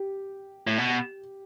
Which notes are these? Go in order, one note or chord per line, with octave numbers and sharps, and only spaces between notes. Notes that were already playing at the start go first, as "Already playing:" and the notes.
Already playing: G4
A2
B2